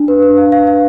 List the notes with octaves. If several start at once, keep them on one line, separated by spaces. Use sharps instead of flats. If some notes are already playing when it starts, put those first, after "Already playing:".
Already playing: D4
B4
B4
F5
F5
F5